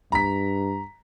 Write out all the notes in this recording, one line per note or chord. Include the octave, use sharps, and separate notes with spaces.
G2 A#5 B6